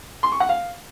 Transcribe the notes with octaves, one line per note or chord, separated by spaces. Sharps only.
C6
C#6
F#5
F5